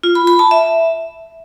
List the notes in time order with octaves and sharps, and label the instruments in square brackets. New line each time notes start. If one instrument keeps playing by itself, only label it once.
[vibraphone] F4
B5
B5
A5
E5